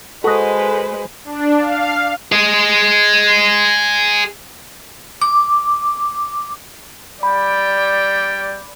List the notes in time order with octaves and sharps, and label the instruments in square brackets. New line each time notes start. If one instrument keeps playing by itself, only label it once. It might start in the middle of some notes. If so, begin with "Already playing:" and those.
[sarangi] G#3 [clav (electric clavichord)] F#4 D#5 [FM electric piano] A4 [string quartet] B4 C5
[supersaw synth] D4
F5
[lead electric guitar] G#4 D#5
[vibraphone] D6
[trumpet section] G3 G5 [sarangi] D5 [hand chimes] B5